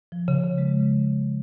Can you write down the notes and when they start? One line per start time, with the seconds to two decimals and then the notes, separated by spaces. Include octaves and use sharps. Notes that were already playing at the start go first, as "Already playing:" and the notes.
0.12 F3
0.28 C#3
0.44 C#3
0.58 G#3